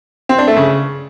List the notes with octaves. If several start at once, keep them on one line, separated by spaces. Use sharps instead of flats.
C4
D4
A3
C#3